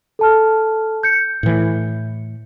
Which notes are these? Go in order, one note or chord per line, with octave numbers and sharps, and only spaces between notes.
A4 A5 F6
G6 C#7
A2 E3